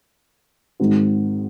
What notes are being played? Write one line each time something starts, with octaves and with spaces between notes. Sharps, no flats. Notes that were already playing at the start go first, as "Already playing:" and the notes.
G#2 D#3 G#3 C4 F#4